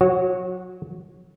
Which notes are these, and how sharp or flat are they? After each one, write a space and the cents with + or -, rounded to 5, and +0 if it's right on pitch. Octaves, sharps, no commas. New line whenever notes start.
F#3 -25 F#4 +0 C#5 -25